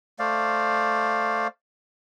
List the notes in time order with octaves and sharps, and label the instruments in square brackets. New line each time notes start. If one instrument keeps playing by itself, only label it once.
[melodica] A3 C5 D5 F5